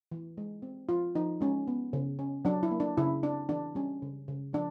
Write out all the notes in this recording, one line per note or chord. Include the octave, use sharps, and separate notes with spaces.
E3
G#3
C4
F3 F4
F3 D#4
G#3 C#4
B3
C#3
C#4
F#3 D4
E4
A#3
D4
C#3 E4
C4 D4
E3 D4
G3 C#4
C#3
C#3
F3 D4